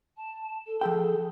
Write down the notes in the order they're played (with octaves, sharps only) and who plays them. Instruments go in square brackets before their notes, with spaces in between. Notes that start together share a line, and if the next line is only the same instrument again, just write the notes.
[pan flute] A5
A4
[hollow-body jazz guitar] F3 A4 G5 [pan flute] G#4